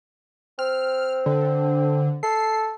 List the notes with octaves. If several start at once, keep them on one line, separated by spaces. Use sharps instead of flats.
C4 F6
D3
A4 C7